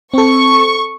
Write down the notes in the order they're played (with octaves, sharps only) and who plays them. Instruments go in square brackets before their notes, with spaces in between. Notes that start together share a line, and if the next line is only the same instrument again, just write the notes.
[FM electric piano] C4 A4 [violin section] C#6